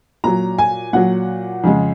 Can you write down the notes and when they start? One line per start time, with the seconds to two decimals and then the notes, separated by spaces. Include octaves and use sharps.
0.24 A#2 F#3 A#5
0.58 G#5
0.93 A#2 F#3 F#5
1.64 F2 C#3 G#3